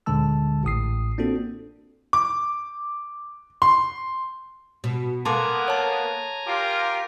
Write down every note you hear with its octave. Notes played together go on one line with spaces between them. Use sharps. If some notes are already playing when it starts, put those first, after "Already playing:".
D2 A#2 D3 G#3 A5 E6
A1 A2 D#6 C7
A#3 C4 D4 F4 F#4 A4
D6
C6
B2
A#3 B3 A4 G#5 A#5 C6 D6
C#5 A5
F4 G4 A#4